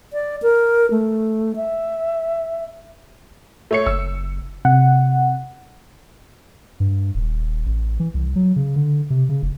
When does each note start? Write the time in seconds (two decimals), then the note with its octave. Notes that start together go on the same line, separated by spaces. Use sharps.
0.13 D5
0.42 A#4
0.91 A3
1.56 E5
3.71 A3 C#5 C#7
3.87 F#1 E6
4.65 C3 F#5
6.80 G2
7.15 D#1
7.66 A1
8.00 E3
8.14 C2
8.36 F#3
8.56 C#3
8.76 D3
9.10 C3
9.29 C#3
9.42 F1